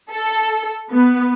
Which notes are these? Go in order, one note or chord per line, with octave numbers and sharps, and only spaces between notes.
A4
B3